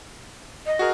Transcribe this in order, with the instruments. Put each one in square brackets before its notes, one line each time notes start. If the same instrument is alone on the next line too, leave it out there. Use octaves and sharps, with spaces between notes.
[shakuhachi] D#5
[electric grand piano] F#4 G#4 A#4